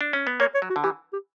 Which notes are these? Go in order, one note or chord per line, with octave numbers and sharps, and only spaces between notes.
D4
C#4
B3
A#3 C#5
C#5
F#3
F#4
D3
E3 G4
G4